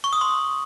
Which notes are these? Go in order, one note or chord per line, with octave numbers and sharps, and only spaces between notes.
C#6
D#6
C6